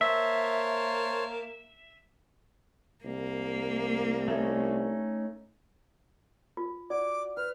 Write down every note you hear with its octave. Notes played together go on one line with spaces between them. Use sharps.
A#3 C5 C#5 E5 A5
C2 A#3
A3 C#4 D#4
F4
F#4 D5 D6
B4 F6